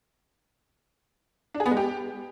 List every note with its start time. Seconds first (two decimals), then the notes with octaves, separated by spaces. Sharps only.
1.54 D4
1.60 G#4
1.66 B3
1.71 G#3
1.77 G4